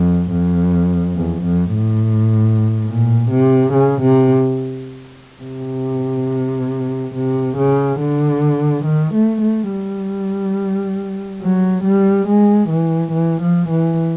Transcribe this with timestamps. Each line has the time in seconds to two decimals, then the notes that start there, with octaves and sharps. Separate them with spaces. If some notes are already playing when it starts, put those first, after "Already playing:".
Already playing: F2
0.32 F2
1.16 E2
1.44 F2
1.74 A2
2.87 A#2
3.31 C3
3.73 C#3
4.02 C3
5.43 C3
7.15 C3
7.58 C#3
8.00 D3
8.85 D#3
9.15 A3
9.42 A3
9.71 G3
11.42 F#3
11.84 G3
12.28 G#3
12.70 E3
13.13 E3
13.42 F3
13.70 E3